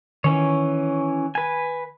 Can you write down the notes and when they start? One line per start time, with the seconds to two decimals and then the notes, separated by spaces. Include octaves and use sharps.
0.24 D#3 E3 C#4 C#5
1.35 B4 G#5